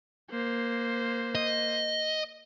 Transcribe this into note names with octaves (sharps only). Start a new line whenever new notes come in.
A#3 C5
D#5